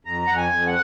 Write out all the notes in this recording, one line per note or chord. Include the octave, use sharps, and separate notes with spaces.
F2 A#5
F2 F#5
G#5
F2
F#5